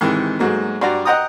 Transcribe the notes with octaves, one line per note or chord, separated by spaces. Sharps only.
G#2 C3 D#3 E3
G#2 F#3 A3 A#3
G2 F#4 D5 A#5
D#5 F#5 G5 A#5 D#6